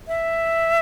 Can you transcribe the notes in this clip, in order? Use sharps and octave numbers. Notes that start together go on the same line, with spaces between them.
E5